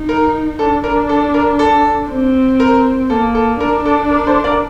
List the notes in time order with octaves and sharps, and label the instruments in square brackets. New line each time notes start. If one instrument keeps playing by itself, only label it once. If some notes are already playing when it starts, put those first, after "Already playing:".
Already playing: [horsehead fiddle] D#4
[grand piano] A#4
[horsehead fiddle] D4 [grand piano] A4
[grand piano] A#4
A4
A#4
A4
[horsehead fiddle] C4
[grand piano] A#4
[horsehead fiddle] A#3 [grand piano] A4
[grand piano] A4
[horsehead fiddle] D4 [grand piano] A#4
[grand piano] A4
A#4
A4 C5
A#4 D5